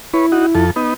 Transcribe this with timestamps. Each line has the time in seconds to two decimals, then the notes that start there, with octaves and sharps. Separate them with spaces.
0.14 E4 B4 C#5
0.32 D#4 F#4
0.55 F2 A4
0.76 B3 D#4